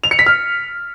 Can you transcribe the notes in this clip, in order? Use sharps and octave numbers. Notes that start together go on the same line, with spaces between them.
F7
C#7
B6
F6